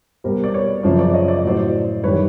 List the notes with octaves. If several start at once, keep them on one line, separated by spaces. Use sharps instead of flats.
B2 G3 A#4 C5
D5
B4 C#5
C#5
F#2 C#3 F3 C5 D5
C5 D5
C#5 D#5
D5
D#5
A2 F#3 C5 D5
F#2 D#3 G3 B4 C#5